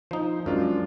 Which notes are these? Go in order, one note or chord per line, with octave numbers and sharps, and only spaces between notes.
F3 D#4 C5
F#2 G#3 D4 F4